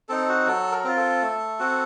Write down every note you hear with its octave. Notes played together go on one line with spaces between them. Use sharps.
C4 D#4 A4
F#4
F#3 A4
A#4
C4 F4
A4
A3
C4 F#4